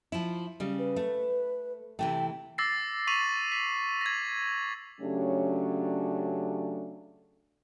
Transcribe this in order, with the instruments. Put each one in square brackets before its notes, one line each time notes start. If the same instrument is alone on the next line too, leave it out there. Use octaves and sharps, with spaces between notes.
[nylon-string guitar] F3 E4
C#3 G3
[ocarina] B4
[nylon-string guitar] A3
[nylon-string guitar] C3 E3 A3 [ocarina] G5
[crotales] D6 E6 A6 A#6 C7
C#6 B6 C7 D#7 F7 F#7
B6
G#6 A#6
[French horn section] C#3 F#3 A3 C#4 D4 G4